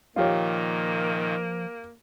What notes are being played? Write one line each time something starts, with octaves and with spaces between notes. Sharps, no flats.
A#2 D#3 F3 A#3 F4 G4 C#5